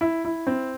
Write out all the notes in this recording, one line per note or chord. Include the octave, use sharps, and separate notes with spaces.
E4
E4
C4